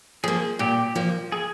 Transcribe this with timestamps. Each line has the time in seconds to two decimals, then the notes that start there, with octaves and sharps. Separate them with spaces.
0.24 F3 A#3 G#4
0.59 A#2 G4
0.95 F3 A#3
1.32 G#4